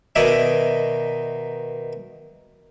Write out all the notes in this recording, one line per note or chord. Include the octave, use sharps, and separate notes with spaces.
B2 D#3 D#4 D5 E5 G#5